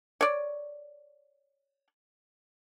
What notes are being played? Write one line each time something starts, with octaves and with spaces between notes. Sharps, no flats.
C#5 D5